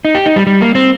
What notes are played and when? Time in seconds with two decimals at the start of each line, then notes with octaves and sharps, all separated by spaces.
0.05 D#4
0.15 G4
0.26 D#4
0.36 G3
0.47 G3
0.61 A#3
0.75 C4